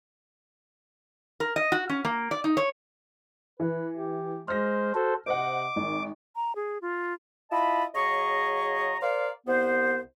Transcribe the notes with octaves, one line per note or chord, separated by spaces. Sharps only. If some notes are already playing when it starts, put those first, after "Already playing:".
A#4
D#5
F#4
C#4
A#3
D5
D#4
C#5
E3 B4
G4
G#3 C5 F6 A#6
F#4 A4 C5
C3 C5 D#5 F#5 D6
G#1 D#3
A#5
G#4
F4
E4 F4 D#5 A5 B5
C#3 F#3 G#4 D#5 A#5 C#6
A#4 C5 D5 F5
C2 B3 C5